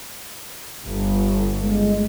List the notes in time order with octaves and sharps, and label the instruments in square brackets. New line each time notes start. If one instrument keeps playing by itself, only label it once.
[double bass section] G1
[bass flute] G#3